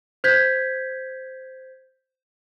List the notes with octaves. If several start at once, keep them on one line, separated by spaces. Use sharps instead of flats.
C5 G6 G#6 B6